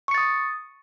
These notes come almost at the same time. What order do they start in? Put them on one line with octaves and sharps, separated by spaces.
C#6 C#7 A6 D#6